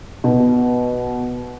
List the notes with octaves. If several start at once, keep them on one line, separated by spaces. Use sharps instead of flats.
B2